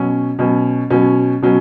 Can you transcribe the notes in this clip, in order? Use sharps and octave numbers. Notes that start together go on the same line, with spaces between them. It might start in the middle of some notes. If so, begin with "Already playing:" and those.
Already playing: B2 F#3 C#4
B2 F#3 C#4
B2 F#3 C#4
B2 F#3 C#4